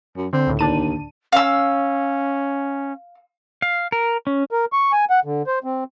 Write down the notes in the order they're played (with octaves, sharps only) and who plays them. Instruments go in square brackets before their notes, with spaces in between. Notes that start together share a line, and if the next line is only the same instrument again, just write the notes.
[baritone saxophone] F#2
[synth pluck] D3 [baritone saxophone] C4
[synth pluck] C#2 A2
[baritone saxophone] D#2 [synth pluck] D4 A5 D#7
[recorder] C#4 [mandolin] F5 E6
[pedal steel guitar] F5
A#4
C#4
[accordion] A#4
C#6
G#5
F#5
D3
C5
C4